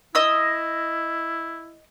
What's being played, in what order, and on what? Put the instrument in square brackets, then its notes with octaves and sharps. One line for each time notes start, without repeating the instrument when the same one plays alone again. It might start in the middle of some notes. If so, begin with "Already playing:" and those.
[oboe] E4 [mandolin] D#5 D#6 E6